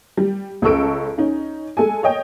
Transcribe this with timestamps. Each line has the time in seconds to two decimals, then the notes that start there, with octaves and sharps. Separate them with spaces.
0.17 G3
0.62 C#2 C#3 A4 C#6 E6 D7
1.18 C#4 D#4
1.77 G#3 A4 G#5
2.03 C#5 D#5 G5